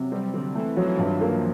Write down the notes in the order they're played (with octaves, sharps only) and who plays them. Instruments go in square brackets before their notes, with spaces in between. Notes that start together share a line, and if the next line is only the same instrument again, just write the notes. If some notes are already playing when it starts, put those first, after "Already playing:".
Already playing: [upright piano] C3 [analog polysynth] F#3
[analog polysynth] G3 [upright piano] C4
[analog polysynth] D3 [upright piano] C4
[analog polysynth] E3 [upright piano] A3
[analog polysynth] F3 [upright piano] F#3
[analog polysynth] E3
[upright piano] G2 [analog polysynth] D#3
[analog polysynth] E3
[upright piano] A#3